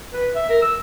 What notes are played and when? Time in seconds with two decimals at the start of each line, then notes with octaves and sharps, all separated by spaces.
0.13 B4
0.35 E5
0.49 A#4
0.62 E6